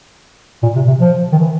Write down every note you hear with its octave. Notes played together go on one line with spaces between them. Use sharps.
A#2
C3
C3
F3
D#3
E3